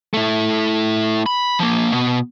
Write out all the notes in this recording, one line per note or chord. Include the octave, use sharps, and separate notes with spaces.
A3 E4
B5
F3 A#3
B2